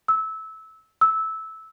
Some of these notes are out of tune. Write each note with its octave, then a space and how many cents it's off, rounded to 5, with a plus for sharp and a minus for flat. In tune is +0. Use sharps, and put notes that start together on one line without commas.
E6 -20
E6 -15